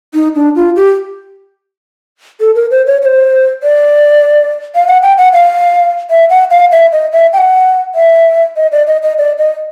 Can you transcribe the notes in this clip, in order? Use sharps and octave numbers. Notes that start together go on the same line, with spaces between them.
D#4
D4
F4
G4
A4
A#4
C5
C#5
C#5
C5
D5
F5
F#5
G5
F#5
F5
E5
F#5
F5
E5
D#5
E5
G5
F#5
E5
D#5
D5
D#5
D#5
D5
D#5